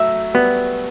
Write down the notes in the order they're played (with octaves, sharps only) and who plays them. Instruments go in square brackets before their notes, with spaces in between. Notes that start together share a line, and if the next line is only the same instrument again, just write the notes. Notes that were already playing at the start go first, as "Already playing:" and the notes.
Already playing: [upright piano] F#3 A3 [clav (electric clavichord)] E5
[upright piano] G3 [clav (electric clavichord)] B3